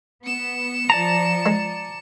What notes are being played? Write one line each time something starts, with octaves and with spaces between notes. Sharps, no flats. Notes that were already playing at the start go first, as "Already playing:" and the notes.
B3 C#7 E7
F3 D5 A5 A#5
G#3